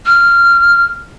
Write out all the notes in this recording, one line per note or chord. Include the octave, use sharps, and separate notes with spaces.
F6